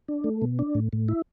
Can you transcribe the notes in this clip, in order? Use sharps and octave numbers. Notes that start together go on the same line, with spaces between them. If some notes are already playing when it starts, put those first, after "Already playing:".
D4
A3
B2
D4
A2
A2
E4